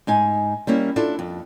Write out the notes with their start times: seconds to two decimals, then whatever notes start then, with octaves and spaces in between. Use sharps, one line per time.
0.07 G#2 D#4 G#5
0.67 G3 A#3 C#4 E4
0.96 D4 E4 F4 A4
1.19 F2